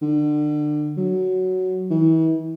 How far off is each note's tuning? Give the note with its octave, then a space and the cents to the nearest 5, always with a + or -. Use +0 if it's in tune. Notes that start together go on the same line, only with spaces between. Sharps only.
D3 +30
F#3 +5
E3 -35